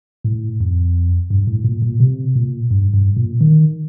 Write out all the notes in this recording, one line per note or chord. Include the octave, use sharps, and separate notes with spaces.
A2
F2
G2
A2
A#2
A#2
C3
A#2
G2
G2
A#2
D#3